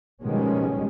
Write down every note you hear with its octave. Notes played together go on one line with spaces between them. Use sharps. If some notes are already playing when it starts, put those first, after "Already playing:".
B2 D#3 F3 G3 G#3 C#4